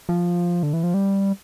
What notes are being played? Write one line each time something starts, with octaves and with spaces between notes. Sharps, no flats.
F3
D3
E3
F3
G3